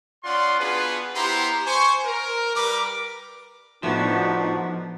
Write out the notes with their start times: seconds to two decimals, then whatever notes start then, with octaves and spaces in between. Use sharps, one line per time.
0.24 C#4 F4 D5 F#5 C6
0.59 B3 D4 F4 F#4 G#4 B4
1.14 B3 E4 G4 C5 A#5 C6
1.65 C5 G#5 C#6
2.05 A#4
2.55 G3 A#4 B4 D6
3.83 A2 F3 B3 D4 D#4 F#4